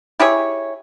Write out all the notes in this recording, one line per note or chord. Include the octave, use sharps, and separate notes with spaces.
E4 G4 G#4 C#5